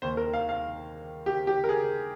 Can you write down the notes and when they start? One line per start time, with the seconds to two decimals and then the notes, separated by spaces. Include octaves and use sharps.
0.02 D#2 D#3 A#3 C5
0.17 A#4
0.33 F5
0.49 F5
1.26 G4
1.47 G4
1.64 A#4
1.69 G#4